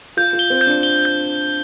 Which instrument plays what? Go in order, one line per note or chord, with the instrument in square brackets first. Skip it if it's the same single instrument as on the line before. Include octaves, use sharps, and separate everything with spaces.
[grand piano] F4 [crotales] G6
[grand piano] F4
[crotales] G7
[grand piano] C4
[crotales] G6
[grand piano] D4
[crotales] G7
G6